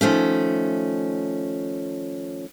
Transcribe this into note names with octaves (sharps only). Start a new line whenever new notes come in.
D#3 F3 A3 C#4